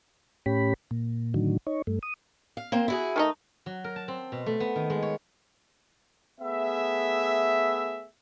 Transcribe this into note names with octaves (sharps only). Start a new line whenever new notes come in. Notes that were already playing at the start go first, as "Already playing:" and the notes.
A2 C#4 G4 B5
A#2
A2 D3 D#3 F#3
D#4 C#5
G2 A3
D#6
F5
A#3 C4 C5
E4 F#4 G#4
D#3 A3 D#4
F#3
A#4
A5
C4
B2
A3
B3
D#3
G#3
C#5
A3 B3 G#4 E5